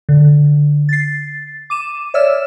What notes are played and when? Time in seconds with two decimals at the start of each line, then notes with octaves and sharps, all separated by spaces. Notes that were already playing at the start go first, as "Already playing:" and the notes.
0.09 D3
0.89 A6 C7
1.70 D6 D#7 E7
2.14 C#5 D5 E5 E6 F6 E7